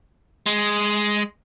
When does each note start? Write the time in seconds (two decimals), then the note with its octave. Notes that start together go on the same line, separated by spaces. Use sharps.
0.46 G#3